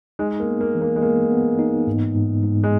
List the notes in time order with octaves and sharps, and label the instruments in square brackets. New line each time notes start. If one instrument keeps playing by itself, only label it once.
[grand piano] G#3 [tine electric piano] D#4
[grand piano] A#3
[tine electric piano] B3
[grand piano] A#3
[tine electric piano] E3
[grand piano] A#3
G#3
[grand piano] A#3 [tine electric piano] B3
[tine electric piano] B3
D#4
G#2
G#2
G#2
[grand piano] G#3